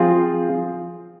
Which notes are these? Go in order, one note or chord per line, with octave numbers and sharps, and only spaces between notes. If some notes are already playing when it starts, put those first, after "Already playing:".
Already playing: F3 C4 F4 G#4